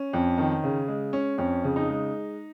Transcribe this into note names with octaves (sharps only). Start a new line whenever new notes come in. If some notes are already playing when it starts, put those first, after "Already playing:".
Already playing: C#4
F2
D#3
C#3
G#3
C#4
F2 C#4
C#3
D#4
G#3